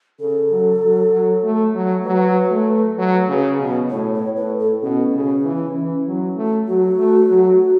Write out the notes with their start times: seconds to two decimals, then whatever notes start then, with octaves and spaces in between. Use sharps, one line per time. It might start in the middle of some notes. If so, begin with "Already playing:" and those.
0.20 C#3 A4
0.51 F#3
0.82 F#3
1.12 F#3
1.43 A3
1.74 F#3
2.05 F#3 B4
2.51 A3
2.98 F#3
3.28 C#3
3.59 B2
3.90 A2 C#5
4.14 C#5
4.36 A2 B4
4.59 A4
4.82 B2 C#4
5.13 C#3
5.45 E3
5.76 E3
6.06 F#3
6.36 A3
6.68 F#3 F#4
6.98 A3
7.29 F#3